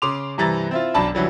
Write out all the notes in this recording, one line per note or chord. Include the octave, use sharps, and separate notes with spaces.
C#3 C6 D6 F7
G2 C3 E3 A#5 A6
C4 E4 F4
B1 F#2 D4 A5 B5
D3 E3 F#3 G3